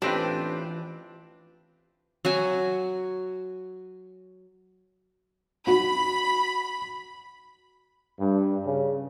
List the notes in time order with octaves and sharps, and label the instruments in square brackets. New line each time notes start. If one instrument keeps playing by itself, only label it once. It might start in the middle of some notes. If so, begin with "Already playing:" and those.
[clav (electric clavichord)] A1 C4 B4 [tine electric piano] E3 F4 [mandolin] D4 [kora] G4
[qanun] F#3 F#4 G#5
[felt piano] F#4 [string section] B5
[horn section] G2
C#3